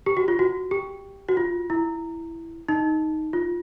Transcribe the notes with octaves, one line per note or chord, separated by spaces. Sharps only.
G4
F#4
F4
F#4
G4
F#4
F4
E4
D#4
F4